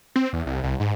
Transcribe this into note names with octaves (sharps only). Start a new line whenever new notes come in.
C4
E2
C2
C2
G#2